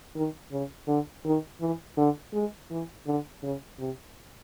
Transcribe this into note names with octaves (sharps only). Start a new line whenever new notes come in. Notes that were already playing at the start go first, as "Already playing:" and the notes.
D#3
C#3
D3
D#3
E3
D3
G#3
E3
D3
C#3
C3